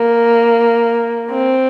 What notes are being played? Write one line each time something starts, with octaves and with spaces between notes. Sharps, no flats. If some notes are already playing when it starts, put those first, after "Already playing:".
Already playing: A#3
C4